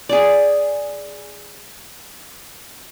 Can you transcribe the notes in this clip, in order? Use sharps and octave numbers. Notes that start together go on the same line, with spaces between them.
G#4 D5